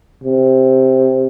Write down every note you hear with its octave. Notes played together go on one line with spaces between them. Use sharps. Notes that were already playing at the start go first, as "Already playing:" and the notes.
C3